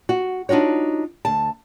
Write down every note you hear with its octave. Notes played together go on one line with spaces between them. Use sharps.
F#4
D4 D#4 F4 F#4 C#5
D2 A5